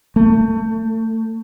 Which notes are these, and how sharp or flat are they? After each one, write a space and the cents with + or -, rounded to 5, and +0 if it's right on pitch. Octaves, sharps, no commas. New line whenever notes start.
A3 +25